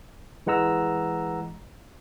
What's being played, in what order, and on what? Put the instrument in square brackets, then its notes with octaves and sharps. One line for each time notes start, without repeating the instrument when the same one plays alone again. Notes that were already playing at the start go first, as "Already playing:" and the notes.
[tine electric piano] E3 G#3 F#5 A#5 E6